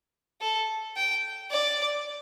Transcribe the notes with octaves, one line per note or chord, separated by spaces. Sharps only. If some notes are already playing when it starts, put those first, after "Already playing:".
A4
G5
D5